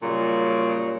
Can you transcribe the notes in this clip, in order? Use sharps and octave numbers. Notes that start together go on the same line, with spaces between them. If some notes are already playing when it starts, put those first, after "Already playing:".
A#2 C#3 F#3 G3